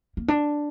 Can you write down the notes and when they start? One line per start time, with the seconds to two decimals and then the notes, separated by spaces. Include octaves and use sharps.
0.17 A#3
0.28 D4